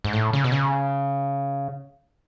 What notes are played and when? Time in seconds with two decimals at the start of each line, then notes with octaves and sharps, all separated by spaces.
0.04 G#2
0.13 A2
0.33 C#3
0.44 B2
0.52 C#3